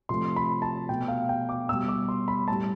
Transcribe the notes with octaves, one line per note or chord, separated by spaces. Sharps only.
C3 F3 A3 C6
B5
A5
B2 A3 G5
F5
G5
D6
B2 G3 E6
D6
C6
B5
A2 G3 A5